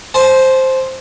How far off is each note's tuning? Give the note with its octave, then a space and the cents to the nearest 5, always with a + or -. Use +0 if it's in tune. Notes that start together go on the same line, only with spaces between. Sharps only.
C5 +5 A5 -35